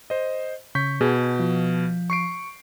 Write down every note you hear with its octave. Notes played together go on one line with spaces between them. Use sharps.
C5 D#5
C#3 C#6 G6 B6
B2 G#4
F3
C#6 C7 D7